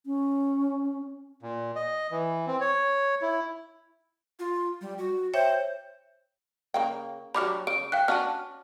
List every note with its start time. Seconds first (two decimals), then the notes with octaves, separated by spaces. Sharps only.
0.06 C#4
1.42 A#2
1.76 D#5
2.11 E3
2.47 C4
2.61 C#5
3.22 E4
4.39 F4
4.81 G3
4.98 F#4
5.34 C5 C#5 E5 G5
6.74 C#3 A#3 G5
7.35 F#3 G3 D4 B5 D6 F6
7.67 C#3 D7
7.92 F5 G5 F#6
8.08 C#4 D4 F#4 A5 F6